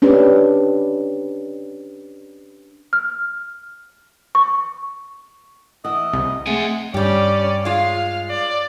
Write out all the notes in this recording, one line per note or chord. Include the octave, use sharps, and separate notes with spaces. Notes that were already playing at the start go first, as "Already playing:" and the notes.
C#4 D4 G4 B4
F6
C#6
E3 D#5 E5 F#5
C2
G#3 A3 C4 F#5 G#5
G2 G3 C#4 G4 D5
G#3 F4 F5
D5